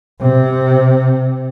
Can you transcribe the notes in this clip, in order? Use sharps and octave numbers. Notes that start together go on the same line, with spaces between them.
C3